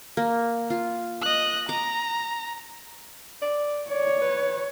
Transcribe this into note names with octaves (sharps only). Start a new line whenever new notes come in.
A#3
F4
D#5 F#6
A#5 D6
D5
C#5 D5
B4